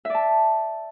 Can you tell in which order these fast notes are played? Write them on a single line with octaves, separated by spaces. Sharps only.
E5 D5 A5